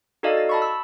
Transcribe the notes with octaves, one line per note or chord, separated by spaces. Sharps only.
D#4 F#4 A4 D5 D#5 F5
A6
A5 B5 C#6
E6